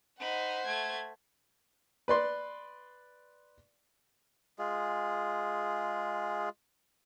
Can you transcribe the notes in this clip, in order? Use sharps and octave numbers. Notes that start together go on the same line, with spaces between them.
D#4 C5 F#5 B5
A3 G#6
B4 D5 C6
G#3 F4 G#4